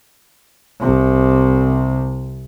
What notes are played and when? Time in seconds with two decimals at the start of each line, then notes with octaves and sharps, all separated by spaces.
0.80 C2 C3